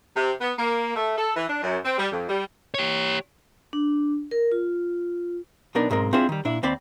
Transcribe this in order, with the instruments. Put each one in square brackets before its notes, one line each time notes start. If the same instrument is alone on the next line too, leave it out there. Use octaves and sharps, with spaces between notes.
[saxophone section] C3
B3
A#3
A3
A4
E3
D4
F#2
C4
G3
F2
G3
[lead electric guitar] G4 C#5
[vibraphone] D4
A#4
F4
[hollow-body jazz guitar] B1 B3 D4 D#4 A#4 D5
B1 G#2 G#3 C4 A#4
C4 D4 E4 F4 G#4 C5
D#3 G3
A#2 D4 E4
D#2 C4 D5 B5